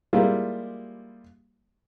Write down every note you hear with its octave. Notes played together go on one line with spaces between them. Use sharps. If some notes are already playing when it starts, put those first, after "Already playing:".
G3 G#3 A#3 E4 F4 G4